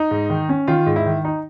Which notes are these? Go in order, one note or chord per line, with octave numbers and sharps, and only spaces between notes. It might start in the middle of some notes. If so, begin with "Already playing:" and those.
Already playing: D#4
G#2
D#3
C#4
D#3 F4
G#2
E4
D#3
D#4